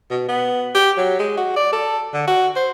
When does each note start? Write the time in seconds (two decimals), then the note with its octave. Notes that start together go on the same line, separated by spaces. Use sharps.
0.11 B2
0.28 B3
0.75 G4
0.97 F#3
1.20 G#3
1.37 F#4
1.56 D5
1.73 A4
2.14 D3
2.28 F#4
2.56 C5